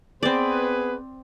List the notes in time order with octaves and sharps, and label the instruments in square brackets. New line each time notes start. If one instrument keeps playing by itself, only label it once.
[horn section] B3 G#4 B4 [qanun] C4 D5